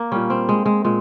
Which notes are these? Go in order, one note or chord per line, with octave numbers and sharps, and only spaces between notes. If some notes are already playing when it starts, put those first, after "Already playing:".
Already playing: A#3
A#2 G3 C#4
C4
G#3
G#3
A#2 G#3